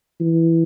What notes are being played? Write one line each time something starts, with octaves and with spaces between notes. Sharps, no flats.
E3